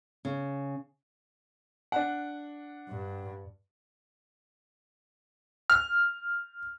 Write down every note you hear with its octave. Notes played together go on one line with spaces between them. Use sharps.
C#3
D4 F#5
G2
F6